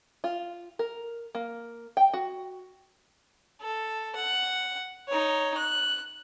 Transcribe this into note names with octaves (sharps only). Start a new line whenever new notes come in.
F4
A#4
A#3
G5
F#4
A4
F#5
D#4 C#5
F#6